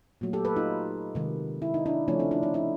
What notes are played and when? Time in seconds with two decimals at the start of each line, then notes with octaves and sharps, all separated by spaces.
0.21 A#2 F#3 A3
0.33 G4 A4
0.45 A4 B4
0.56 D#4 F4
1.15 C3 D#3 G#3
1.62 E4
1.74 D#4
1.86 D4 E4
2.08 C#3 F3 A3 C#4 D#4
2.19 C4 D4
2.31 D4 E4
2.43 C#4 D#4
2.54 D4 E4